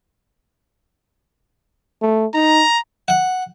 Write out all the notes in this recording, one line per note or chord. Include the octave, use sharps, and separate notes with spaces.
A3
D#4 A#5
F#5